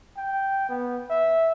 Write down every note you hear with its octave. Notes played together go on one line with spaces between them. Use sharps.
G5
B3
E5